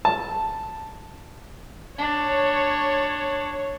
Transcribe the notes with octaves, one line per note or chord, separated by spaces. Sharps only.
A5
D4 C#5